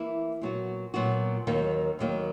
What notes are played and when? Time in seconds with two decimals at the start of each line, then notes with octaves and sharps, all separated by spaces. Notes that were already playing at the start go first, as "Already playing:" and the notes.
Already playing: E3 A#3 E4
0.42 A#2 F#3 B3 F#4
0.94 A#2 F#3 B3 F#4
1.47 D#2 D#3 F#3 A#3
1.99 D#2 D#3 F#3 A#3